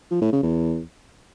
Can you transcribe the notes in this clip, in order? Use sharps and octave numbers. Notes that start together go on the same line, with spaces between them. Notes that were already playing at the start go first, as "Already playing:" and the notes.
F3
A2
C#3
E2